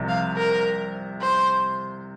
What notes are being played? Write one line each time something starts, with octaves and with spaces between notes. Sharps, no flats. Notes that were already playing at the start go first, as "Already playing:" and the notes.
Already playing: C2 C3 F3
F5
A#4
C5